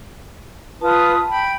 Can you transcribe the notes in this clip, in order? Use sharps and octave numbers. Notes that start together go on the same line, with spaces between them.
F4 B4 A5 D#6
G5 B5